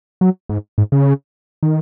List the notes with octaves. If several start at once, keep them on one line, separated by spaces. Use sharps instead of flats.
F#3
G#2
G#2
C#3
D#3